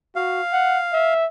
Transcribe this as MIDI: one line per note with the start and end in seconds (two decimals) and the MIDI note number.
0.16 0.42 66
0.16 1.14 77
0.53 0.79 78
0.93 1.27 76